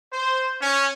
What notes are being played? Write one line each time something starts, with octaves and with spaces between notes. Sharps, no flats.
C5
C#4